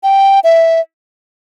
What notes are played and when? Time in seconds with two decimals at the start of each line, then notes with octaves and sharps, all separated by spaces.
0.03 G5
0.44 E5